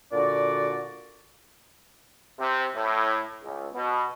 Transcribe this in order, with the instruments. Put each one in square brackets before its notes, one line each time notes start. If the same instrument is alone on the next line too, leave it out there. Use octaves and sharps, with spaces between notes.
[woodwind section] A#2 D3 F#4 D5
[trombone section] C3
A2
C#2
B2